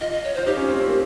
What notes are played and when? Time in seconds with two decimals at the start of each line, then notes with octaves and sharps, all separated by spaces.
0.01 F4 D#5
0.12 D#5
0.24 C#5
0.35 F4 C5
0.46 D#4 G4
0.57 C#4
0.68 C4
0.80 C4
0.88 A#3